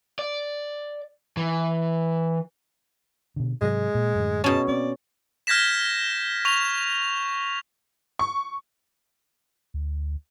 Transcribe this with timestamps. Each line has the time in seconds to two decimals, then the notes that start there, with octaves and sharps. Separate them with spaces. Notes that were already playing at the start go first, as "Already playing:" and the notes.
0.19 D5
1.37 E3
3.36 B2 D3
3.61 G#2 C3 F#3 G#3
3.95 A#2
4.15 F#2 A2 D3
4.44 B2 C#4 A5
4.68 C4 D5
5.47 F6 G6 G#6 A#6 B6 E7
6.45 C#6 F7
8.19 C#6
9.74 D2